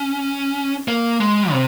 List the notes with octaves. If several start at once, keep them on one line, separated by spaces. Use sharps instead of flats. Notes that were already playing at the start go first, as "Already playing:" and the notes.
Already playing: C#4
A#3
G#3
C3